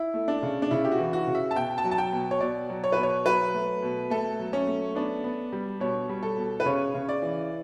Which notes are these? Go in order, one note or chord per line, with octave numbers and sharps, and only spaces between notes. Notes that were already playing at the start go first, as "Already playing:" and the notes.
Already playing: E4
A3
D4
C#3
D4
C#3 E4
G4
F#4
E3
F#4
C#3
E5
A5
B2 G5
A5
F#3
A5
G5
B2
C#5
B2 D5
F#3
C#5
B2 B4
C#5
F#3 B4
A3
B2
A3 A4
F#3
C#4
A3
B3 D4
B3
G3
B2 C#5
G3
A4
B2
B4
C#3 C#5
C#3
D5
E3